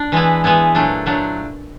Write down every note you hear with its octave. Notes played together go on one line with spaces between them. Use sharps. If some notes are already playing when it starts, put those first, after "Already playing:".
Already playing: D4
E3 G#3 B3 E4
E3 G#3 B3 E4
A#2 F#3 A3 D4
A#2 F#3 A3 D4